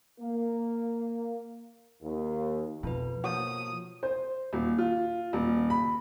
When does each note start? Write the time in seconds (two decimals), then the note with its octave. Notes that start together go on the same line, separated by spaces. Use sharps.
0.19 A#3
2.03 D#2
2.83 F2 B2 E4 F4 B4
3.24 F3 A#3 F#4 C#5 D#6
4.03 C5
4.53 D#1
4.78 F4
5.33 D#1
5.70 B5